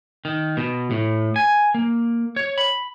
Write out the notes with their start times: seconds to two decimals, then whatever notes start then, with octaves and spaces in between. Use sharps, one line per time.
0.25 D#3
0.57 B2
0.91 A2
1.36 G#5
1.74 A#3
2.36 C#5
2.58 B5